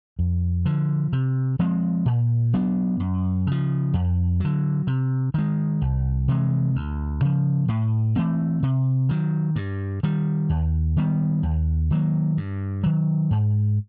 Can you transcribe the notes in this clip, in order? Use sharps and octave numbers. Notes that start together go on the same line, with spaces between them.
F2
D3 F3
C3
F3 G#3 C4
A#2
F#3 B3 D4
F#2
C#3 F3
F2
D3 F#3
C3
D#3 G#3
C2
C3 E3 G#3
D2
C#3 F3
A2
E3 A3 C4
C3
D#3 F#3
G2
D#3 G3
D#2
D#3 G3 B3
D#2
D#3 F#3 A#3
G2
D#3 F#3
G#2